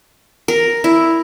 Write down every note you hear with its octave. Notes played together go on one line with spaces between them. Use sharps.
A#4
E4